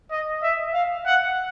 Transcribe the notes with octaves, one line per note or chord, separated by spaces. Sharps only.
D#5
E5
F5
F#5